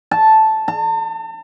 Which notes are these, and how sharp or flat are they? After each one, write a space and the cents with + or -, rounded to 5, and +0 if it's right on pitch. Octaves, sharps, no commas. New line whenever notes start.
A5 -5
A5 +40